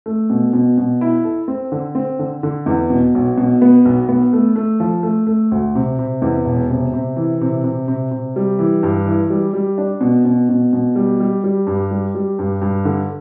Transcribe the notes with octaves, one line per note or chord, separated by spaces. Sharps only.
A3
B2
B2
B2
E4
A4
C4
D3
C4
D3
D3
E2
B2
B1
B2
B3
B1
B3
A3
A3
F3
A3
A3
D2
C3
C3
E2
E1
C3
C3
E3
C3
C3
C3
C3
G3
E3
G2
E3
G3
G3
D4
B2
B2
B2
B2
G3
G3
G3
G2
G3
G3
G2
G2
D3